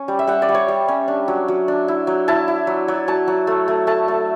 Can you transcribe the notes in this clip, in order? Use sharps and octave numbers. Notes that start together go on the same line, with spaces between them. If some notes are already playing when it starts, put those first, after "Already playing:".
Already playing: C#4
G3
E5
G3 F#5
D5
G3
C#5
G3
C#4
D4
F#3
F#3
D4
E4
F#3
E4 A5
E4
F#3
F#3
F#3 A5
F#3
A3
A3
A3 A5
A3